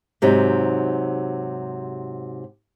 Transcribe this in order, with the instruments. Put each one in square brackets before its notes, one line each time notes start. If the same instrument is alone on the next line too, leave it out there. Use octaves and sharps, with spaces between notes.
[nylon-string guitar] G#2 C3 F#3 D#4